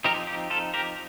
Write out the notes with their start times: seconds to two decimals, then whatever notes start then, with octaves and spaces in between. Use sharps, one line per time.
0.04 F3 C4 D#4 G4 A#4
0.27 G4
0.50 F4 A4
0.74 G4 A#4